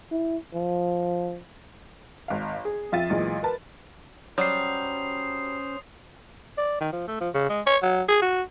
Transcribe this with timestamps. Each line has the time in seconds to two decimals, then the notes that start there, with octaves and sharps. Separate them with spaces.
0.12 E4
0.54 F3
2.28 G#1 F5
2.65 G#4
2.92 F2 F4 E5 A6 D#7
3.10 B1 A#2 E3 G#3
3.43 A#4 B4 A5
4.38 F#3 G3 C#4 C5 D#6 C7
6.58 D5
6.81 D#3
6.92 F3
7.08 A3
7.21 F3
7.34 C#3
7.49 G#3
7.66 C#5
7.83 F#3
8.09 G#4
8.22 F#4